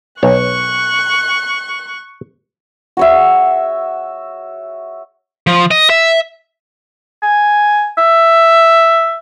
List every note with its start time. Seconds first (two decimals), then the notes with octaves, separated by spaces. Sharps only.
0.23 B1 C#5 C#6 F#6
2.97 F#4 C#5 E5
5.47 F3
5.71 D#5
5.90 E5
7.23 G#5
7.98 E5